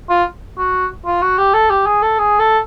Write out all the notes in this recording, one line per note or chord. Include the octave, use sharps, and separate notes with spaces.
F4
F#4
F4
F#4
G4
A4
G4
G#4
A4
G#4
A4